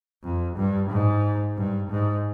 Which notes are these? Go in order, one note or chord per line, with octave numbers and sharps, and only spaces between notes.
F2
G2
G#2
G2
G#2